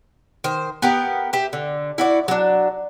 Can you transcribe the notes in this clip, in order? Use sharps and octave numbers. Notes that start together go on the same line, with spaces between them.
D#3 C5
B3 G4 A#4
G4 E5
D3
E4 F#4 D5
F#3 D4